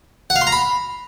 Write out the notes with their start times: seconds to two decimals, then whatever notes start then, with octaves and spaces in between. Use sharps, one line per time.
0.30 F#5
0.36 F5
0.41 C6
0.47 A#5
0.52 B5